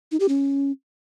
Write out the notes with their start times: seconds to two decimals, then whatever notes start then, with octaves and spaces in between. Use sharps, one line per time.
0.12 D#4
0.20 G4
0.29 C#4